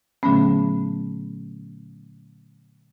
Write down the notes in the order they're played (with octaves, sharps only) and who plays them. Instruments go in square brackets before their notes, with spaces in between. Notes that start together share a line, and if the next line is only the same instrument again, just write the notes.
[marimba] A#2 D3 F#3 A3 B3 C#4